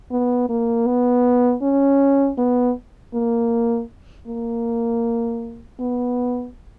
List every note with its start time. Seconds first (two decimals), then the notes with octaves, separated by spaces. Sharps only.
0.11 B3
0.49 A#3
0.87 B3
1.62 C#4
2.38 B3
3.14 A#3
4.27 A#3
5.80 B3